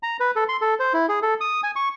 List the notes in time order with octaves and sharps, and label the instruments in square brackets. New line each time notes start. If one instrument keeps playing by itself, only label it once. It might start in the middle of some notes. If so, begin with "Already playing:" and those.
[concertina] A#5
B4
A4
C6
A4
C5
E4
G#4
A4
D#6
G#5
C#6